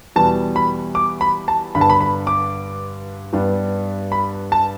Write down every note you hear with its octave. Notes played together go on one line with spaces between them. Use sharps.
E2 B2 G3 B3 A5
B5
D6
B5
A5
G2 D3 B3 B5
A5
B5
B5
D6
G2 G3 B3 D4
B5
A5